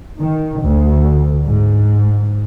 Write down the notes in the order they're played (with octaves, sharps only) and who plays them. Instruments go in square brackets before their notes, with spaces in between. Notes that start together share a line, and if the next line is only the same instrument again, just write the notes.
[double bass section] D#3
D2
G#2